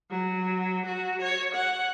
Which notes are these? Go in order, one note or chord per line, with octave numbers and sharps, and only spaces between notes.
F#3
F#4
C#5
F#5